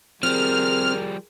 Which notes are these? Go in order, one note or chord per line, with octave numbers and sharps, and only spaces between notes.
F3 G3 C4 G#4 A#4 F6